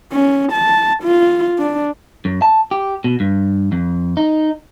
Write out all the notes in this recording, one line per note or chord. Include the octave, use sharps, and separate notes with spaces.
C#4
A5
F4
D4
F#2
A5
G4
B2
G2
F2
D#4